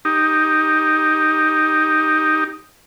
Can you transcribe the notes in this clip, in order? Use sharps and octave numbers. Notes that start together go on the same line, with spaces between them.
D#4 G4